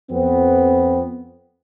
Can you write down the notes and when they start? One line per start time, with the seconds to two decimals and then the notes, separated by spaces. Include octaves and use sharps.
0.11 F2 F3 B3 C4